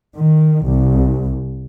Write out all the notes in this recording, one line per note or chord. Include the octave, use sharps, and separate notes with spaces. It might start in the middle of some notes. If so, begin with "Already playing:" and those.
D#3
C2